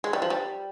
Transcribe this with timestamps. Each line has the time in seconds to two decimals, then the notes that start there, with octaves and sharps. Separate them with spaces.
0.04 G#3
0.13 G3
0.22 F3
0.30 G3